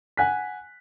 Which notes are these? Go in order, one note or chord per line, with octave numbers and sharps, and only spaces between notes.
F#5 G#5 F#6 B6